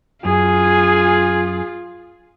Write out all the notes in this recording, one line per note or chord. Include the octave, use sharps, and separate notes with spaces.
F#2 F4 G#4 G#5